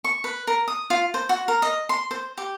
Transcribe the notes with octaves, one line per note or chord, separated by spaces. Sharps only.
C#6
B4
A#4
D#6
F4
C5
F#4
A#4
D#5
C6
C5
G4